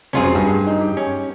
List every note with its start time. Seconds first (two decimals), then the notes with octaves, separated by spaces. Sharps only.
0.13 F1 F#2 C4 C#4 F4 G#4
0.35 G2 G#4
0.67 D#4
0.80 G4
0.97 C#4